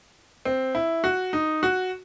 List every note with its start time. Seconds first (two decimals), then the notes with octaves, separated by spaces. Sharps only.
0.45 C4
0.75 E4
1.04 F#4
1.33 D#4
1.63 F#4